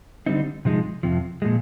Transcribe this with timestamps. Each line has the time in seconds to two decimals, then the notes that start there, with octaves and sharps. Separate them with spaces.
0.26 D3 G3 C4 D#4
0.65 C3 F3 G#3 D#4
1.03 F2 C3 F3
1.42 A#2 F3 G#3